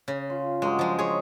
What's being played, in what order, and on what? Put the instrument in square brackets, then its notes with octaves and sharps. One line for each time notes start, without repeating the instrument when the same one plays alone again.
[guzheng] C#3
[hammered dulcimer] F4
[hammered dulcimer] G2 F#3 [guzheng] G#3
[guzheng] F3 G#3
G#4 C#5